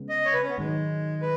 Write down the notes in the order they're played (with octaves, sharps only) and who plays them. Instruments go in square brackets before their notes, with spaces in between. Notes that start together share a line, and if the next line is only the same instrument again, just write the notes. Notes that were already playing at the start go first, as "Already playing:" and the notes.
Already playing: [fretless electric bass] C#3 G#3 B3
[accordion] D#5
C#5
B4
C#4
B3
[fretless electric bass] G#2 D#3 F#3 [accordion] G#3
[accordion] B4